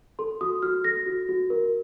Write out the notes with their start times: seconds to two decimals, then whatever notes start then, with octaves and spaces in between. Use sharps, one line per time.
0.19 A4 C6
0.41 F#4 D#6
0.62 F#4 F6
0.84 A4 A#6
1.06 F#4
1.29 F#4
1.50 A#4